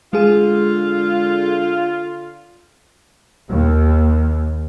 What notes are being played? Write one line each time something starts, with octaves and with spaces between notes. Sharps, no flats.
D3 G#3 F4 G#4
D#2